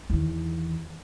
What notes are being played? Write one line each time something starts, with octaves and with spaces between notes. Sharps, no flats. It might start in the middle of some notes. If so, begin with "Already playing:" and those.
E2 D#3